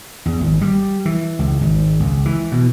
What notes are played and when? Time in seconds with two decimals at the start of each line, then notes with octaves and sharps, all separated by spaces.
0.26 E2
0.40 G#1
0.61 G3
1.05 E3
1.39 C#2
1.61 G#1
2.00 C#2
2.25 E3
2.52 B2